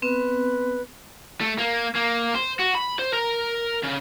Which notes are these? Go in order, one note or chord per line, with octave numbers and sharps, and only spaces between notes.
B3 C4 B4
A3
A#3
A#3
C5
F#4
B5
C5
A#4
C#3